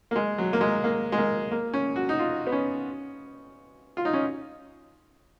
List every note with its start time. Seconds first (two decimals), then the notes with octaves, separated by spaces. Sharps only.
0.11 A#3
0.16 G#3
0.38 F#3
0.53 A#3
0.61 G#3
0.84 A#3
1.12 G#3
1.18 A#3
1.51 A#3
1.74 C#4
1.96 F#4
2.09 D#4
2.19 F4
2.47 B3
2.52 C#4
3.97 F4
4.05 D#4
4.13 C#4